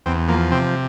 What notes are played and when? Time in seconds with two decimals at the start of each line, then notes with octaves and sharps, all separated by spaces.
0.06 E2 C4
0.28 F3 A#3
0.52 C3 C4